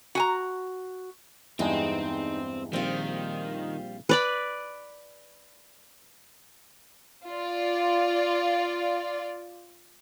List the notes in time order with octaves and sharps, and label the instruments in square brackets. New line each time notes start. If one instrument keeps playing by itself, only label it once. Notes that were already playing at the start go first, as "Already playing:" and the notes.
[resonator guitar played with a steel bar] F#4 G#5 A#5
[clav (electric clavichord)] E2 G2 G#3 [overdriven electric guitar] C4 [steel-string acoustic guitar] D#4
[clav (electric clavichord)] A#1 C4 [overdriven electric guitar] D#3 [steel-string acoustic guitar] G3 F4
[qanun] B4 D5 B5
[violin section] F4 D5